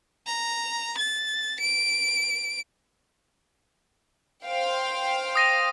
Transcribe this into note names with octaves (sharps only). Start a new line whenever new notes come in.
A#5
A6
D7
C5 F5 G5
D#6 A#6 D#7